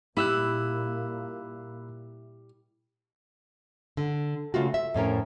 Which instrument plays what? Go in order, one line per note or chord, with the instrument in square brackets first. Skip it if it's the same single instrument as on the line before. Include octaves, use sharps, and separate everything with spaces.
[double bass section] A#2 A#3 [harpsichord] G3 [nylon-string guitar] E4 [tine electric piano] B5 E6 F#6
[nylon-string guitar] D3
C#3 A3 F4 F#4
E5
F2 A2 C#4 A#4